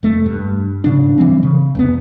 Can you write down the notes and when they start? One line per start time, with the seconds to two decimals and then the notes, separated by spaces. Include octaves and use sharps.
0.03 F1 A3
0.26 G2
0.84 G#2 C#3 D4
1.18 E3 G3 C4
1.43 C#3
1.75 F1 C#2 B3